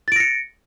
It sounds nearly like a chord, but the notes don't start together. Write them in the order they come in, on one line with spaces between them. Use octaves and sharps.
A6 D7 A#6 C#7